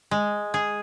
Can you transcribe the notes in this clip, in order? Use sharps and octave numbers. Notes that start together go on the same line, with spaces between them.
G#3
G#4